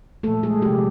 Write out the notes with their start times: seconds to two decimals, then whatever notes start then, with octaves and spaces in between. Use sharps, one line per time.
0.23 A#2 F3 A3 A#3 A4
0.43 G#3 G#4
0.62 C3 F3 G3 G#3 G4